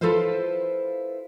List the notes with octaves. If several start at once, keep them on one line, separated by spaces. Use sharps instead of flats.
E4 F4 A4 B4 C5 F5